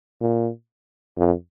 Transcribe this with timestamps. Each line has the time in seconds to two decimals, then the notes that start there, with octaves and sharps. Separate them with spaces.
0.21 A#2
1.17 F2